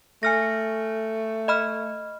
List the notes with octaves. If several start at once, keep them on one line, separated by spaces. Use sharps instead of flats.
A3 G#5 F6 A#6
D#5 B5 F6